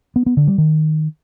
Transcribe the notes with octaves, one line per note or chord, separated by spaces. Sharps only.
B3
B3
D3
G3
D#3